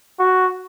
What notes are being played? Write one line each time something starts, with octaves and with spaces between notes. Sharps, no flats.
F#4